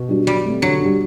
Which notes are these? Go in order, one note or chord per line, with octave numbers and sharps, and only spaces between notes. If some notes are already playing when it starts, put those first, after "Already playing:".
Already playing: B2
G3 D4 F#4
F#3 G3
A3 C4
D3 F#3
G3 D4